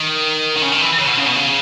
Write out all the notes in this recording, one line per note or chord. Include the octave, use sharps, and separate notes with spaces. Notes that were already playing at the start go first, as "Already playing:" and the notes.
Already playing: D#3
D#3
C#3
D#3
E3
C#3
B2
C#3
B2
C#3